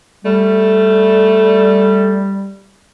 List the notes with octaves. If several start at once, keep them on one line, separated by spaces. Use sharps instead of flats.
G3 A3